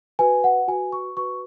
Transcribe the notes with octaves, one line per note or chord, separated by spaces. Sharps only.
F#4 B4 G#5
F#5
F#4 B4 G#5
C#6
F#4 B4 C#6